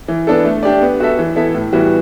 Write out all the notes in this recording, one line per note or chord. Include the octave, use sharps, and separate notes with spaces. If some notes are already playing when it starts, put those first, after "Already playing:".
E3
B3 D4 A4
A3
D4 G4 D5
B3
F#4 A4 E5
E3
B3 E4 A4 E5
A2
E3 G3 B3 F#4